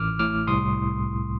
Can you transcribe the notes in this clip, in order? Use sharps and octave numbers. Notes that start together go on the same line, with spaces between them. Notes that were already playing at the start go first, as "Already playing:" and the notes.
Already playing: A1 D6 F6
A2 D6 F6
C2 C6 D#6